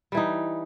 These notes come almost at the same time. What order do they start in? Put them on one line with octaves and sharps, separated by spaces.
G3 E3 D#4